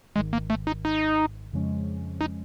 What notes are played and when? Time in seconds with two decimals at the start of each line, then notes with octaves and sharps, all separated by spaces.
0.16 G#1 G#2 D#3 G#3
0.33 A#3
0.50 A3
0.67 D#4
0.85 D#4
1.52 F2 C#3 F3 G#3 C#4
2.21 D#4